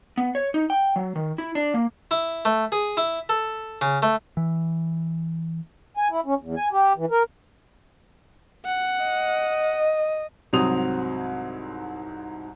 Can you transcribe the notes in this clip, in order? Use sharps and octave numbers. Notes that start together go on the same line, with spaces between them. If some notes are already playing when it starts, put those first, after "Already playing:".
B3
C#5
D#4
G5
F#3
D#3
E4
D4
A#3
E4
A3
G#4
E4
A4
C#3
A3
E3
G#5
E4
C#4
E2
G#5
G4
E3
A#4
F#5
D#5
C2 G#2 F#3 C4 D#6 F7